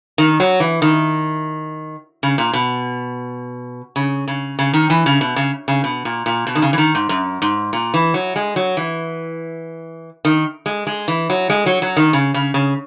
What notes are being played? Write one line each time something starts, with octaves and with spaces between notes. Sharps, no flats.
D#3
F#3
E3
D#3
C#3
A#2
B2
C#3
C#3
C#3
D#3
E3
C#3
B2
C#3
C#3
B2
A#2
A#2
B2
D#3
C#3
E3
D#3
G#2
F#2
G#2
A#2
E3
F#3
G#3
F#3
E3
D#3
G#3
G#3
E3
F#3
G#3
F#3
F#3
D#3
C#3
C#3
C#3